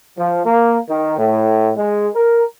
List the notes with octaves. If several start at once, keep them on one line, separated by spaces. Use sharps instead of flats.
F3
A#3
D#3
A2
G#3
A#4